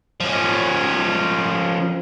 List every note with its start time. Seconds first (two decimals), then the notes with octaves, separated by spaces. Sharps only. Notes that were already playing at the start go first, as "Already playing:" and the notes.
0.20 F3 C#4